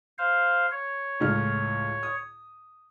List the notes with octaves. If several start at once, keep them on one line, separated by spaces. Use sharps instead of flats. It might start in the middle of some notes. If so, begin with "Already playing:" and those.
C5 F5
C#5
C#2 A2 F6
D#6